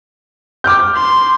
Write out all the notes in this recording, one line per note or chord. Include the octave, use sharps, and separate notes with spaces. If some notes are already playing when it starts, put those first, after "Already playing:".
D6 F6 G6
C6